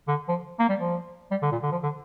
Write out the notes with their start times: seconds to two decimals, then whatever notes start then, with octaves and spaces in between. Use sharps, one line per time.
0.08 D3
0.28 F3
0.59 A#3
0.69 G3
0.80 F3
1.31 G3
1.42 D3
1.52 A#2
1.63 D3
1.72 F3
1.83 D3